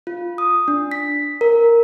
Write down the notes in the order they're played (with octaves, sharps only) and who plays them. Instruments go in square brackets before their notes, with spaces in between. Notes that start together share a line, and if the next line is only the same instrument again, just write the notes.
[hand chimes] F4
D#6
D4
B6
A#4